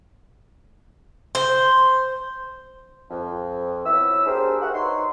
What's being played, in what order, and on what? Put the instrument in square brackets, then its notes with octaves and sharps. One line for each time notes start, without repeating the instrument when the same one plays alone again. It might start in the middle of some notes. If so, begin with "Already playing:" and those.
[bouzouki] C5
[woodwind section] F2
E3 F#3 B3 E5 E6
D4 G4 G#4 A#4 C5
F#4 G4 A#4 C5 E5 F#5
D#4 B4 C#5 A#5 C6